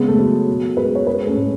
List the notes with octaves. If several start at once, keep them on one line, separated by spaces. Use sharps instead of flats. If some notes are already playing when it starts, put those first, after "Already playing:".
Already playing: C#3 G#3 B3
A3
F#3
B2
G#3 G#4 B4
C#5
G#3 G#4 B4
A3 C#4
A2 G#3